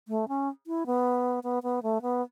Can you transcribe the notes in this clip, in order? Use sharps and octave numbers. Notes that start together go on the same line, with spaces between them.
A3
C#4
E4
B3
B3
B3
A3
B3